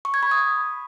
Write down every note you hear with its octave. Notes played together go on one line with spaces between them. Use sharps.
C#6
G#6
B5
D#6